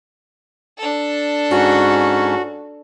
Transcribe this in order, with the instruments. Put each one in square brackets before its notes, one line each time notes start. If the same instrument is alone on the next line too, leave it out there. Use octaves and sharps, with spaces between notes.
[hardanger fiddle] D4 A4
[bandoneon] G#2 C#4 [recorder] F#4